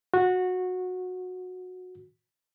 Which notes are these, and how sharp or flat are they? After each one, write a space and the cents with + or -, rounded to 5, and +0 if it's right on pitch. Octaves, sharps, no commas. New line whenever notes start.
F#4 -15